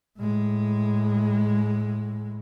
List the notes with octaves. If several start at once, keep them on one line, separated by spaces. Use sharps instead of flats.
A2 G#3